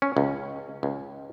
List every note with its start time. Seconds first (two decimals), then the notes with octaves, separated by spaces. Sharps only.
0.02 C#4
0.17 C#2
0.83 C#2